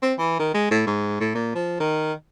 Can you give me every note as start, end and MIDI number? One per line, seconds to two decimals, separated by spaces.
0.02 0.13 60
0.18 0.39 52
0.39 0.52 51
0.54 0.70 56
0.71 0.83 45
0.87 1.19 44
1.20 1.31 45
1.35 1.51 46
1.55 1.76 53
1.80 2.13 51